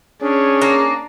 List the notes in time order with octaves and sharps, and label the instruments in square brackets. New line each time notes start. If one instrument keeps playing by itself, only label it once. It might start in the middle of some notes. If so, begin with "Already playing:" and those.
[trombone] C#4 [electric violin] D4 [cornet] G#4
[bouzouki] A#3